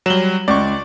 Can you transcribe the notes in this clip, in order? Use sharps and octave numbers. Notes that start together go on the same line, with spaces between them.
F#3 G3 E7 F#7 G7
C#2 D5 C#6